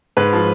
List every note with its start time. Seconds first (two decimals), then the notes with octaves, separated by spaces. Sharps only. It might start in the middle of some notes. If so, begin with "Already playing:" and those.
0.17 G#2 B4
0.33 F3